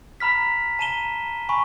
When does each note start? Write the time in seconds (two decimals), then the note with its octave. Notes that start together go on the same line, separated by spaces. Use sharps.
0.20 A#5 B5 F6 B6
0.79 A5 A#5 D#7 E7 G7
1.49 G#5 B5 C#6